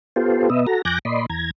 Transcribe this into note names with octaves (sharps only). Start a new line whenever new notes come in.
B3 F4 G4 A4 C5
B2 B3 D#5 E5
F#4 A4 A#5
F2 G#5 D6 F#6 G6 A#6
A#2 D5 D#5 B5 C6
E2 A#5 G#6